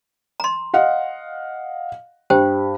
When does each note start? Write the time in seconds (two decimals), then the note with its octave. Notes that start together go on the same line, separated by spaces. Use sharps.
0.40 A#5 C6
0.74 D#5 F5 F#5
2.30 G2 G4 C5 G5